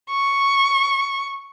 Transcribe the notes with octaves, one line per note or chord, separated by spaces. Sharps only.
C#6